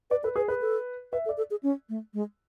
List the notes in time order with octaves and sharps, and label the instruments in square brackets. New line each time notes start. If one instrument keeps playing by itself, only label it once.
[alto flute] B4 [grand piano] D5
[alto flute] A4 [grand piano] B4
[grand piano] G#4 [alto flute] B4
[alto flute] G#4 [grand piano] B4
[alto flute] A4
[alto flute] B4 [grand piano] E5
[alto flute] A4
[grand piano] D5
[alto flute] A4
G#4
C#4
A3
G#3